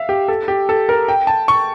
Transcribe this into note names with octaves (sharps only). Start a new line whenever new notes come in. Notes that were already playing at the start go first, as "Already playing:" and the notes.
Already playing: E5 F5
G4
A4
G4
A4
A#4
G5
A5
C#6